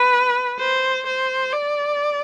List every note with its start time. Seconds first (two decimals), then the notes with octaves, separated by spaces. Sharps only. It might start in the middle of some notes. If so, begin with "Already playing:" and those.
Already playing: B4
0.59 C5
1.06 C5
1.53 D5